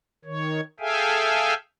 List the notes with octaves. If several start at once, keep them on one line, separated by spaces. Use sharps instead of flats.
D#3 C#5
G#4 A4 E5 F5 G5 G#5